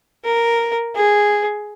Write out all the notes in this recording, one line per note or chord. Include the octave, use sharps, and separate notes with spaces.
A#4
G#4